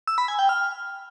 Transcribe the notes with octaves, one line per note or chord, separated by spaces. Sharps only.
E6
B5
G#5
G5
F6